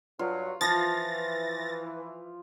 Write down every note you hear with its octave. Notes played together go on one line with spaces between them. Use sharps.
G2 F#3 F4
E3 F3 F4 A6 A#6